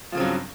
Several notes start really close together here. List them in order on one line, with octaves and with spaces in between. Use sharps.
F3 C#3 C4 F#3 G2